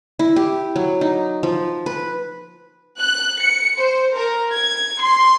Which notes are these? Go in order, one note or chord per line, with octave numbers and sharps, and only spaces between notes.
E4
G4
F#3
D#4
F3
B4
F#6
C#7
C5
A#4
G#6
C6